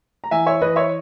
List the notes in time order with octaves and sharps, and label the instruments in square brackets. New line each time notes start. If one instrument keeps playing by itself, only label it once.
[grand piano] A#5
E3 E5 G#5
C#5 E5
E3 B4 D#5
C#5 E5